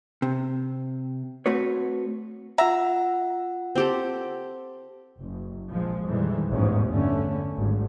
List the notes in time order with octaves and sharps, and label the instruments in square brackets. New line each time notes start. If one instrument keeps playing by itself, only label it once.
[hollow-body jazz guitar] C3
A3 C4 F#4 B4 C#5
[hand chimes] F4 F#5 [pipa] E5 A#5
[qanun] C4 G4 A4
[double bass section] F#1
A#1 F3 G#3
F2 A#2 D#3 E3 G3 G#3
A1 E2 G#2 F3 C#4
G2 D3 A3 C#4
G#1 G2